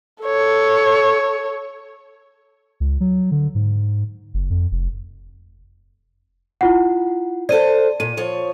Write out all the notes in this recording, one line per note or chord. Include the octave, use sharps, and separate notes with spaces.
A4 C#5
C#2
F#3
D3
G#2
F#1
F2
F1
E4 F4 F#5
A4 C5 D5 D#7
A#2 D#7
F3 C#5